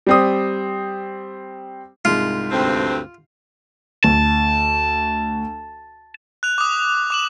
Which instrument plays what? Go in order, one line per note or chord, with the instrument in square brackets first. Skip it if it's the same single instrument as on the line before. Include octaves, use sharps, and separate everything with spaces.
[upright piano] G3 C4 D#6
[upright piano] C2 G#2 G#3 [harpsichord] F4
[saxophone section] D2 G2 C4
[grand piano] D2 [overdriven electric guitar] A5
[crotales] F#6 F7
D6 D#6
D6 E7 F#7